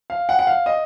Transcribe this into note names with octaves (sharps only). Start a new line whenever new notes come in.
F5
F#5
F#5
F5
D#5